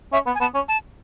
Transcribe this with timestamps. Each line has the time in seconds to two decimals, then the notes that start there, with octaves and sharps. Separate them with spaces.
0.13 C#4 E5
0.26 B3
0.35 G#5
0.40 B3 A5
0.54 C#4
0.68 A5